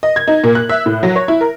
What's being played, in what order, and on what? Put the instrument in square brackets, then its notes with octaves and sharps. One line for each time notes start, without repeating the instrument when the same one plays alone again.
[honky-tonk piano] D#5
G#6
D#4
A#2
F#6
E5
A2
F#3
C#5
E4
A#4